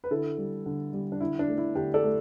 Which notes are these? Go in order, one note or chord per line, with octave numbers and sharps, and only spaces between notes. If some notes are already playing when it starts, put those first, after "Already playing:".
B4
D3 E4 A4
G3
D3
G3
D4
D3 E4
D4
A3
E4
D3 D4 G4
A4 D5
A3